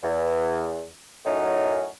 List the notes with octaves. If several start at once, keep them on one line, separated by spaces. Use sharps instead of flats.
E2
F#2 A2 F#3 C#4 D#4